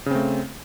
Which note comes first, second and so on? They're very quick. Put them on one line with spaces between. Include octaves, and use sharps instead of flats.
C#3 C4 A3